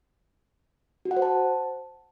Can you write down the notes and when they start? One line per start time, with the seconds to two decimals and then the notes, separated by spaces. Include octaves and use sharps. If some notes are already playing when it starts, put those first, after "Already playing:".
1.05 F#4
1.11 F#5
1.17 C5
1.22 A5